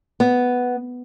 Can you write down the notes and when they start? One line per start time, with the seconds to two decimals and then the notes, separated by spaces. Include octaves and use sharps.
0.20 B3